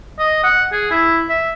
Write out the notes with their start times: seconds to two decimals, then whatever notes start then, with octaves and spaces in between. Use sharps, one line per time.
0.19 D#5
0.44 F#5
0.72 G#4
0.91 E4
1.29 E5